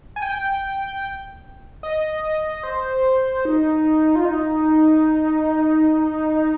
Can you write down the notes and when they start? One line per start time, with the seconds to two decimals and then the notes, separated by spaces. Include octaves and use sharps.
0.16 G#5
0.22 G5
1.83 D#5
2.63 C5
3.45 D#4
4.16 F4
4.25 D#4